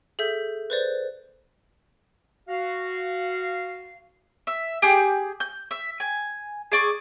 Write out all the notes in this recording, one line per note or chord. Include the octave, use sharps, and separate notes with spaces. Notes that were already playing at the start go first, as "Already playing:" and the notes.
G#4 A4 E5 G6
B4 C5 D5
F#4 F5
E5
G4 G#4
G6
E5
G#5
G#4 D5 C#6